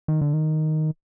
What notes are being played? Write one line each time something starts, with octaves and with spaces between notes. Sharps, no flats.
D#3
D3
D#3